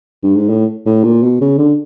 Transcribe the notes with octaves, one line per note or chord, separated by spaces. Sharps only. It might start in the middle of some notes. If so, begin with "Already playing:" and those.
G2
G#2
A2
A2
A#2
B2
C#3
D3